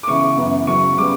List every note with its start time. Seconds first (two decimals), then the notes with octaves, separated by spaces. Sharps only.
0.03 D6
0.07 C#3 E3 B3 C#6
0.37 F#2 E3 B3
0.67 C#3 F#3 B3 C#6
0.97 C#3 G3 B3 D6